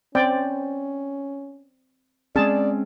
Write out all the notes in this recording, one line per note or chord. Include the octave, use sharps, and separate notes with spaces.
C4 C#4 D5 G5
G#3 C4 C#4 G#4 D5 A5